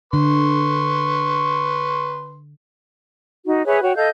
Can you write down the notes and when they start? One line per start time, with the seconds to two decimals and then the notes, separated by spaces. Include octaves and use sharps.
0.13 D3 B4 C6 C#6
3.45 D#4 F#4
3.66 G#4 B4 C#5 E5
3.82 F#4 C#5 G5
3.95 A4 D#5 F5 G6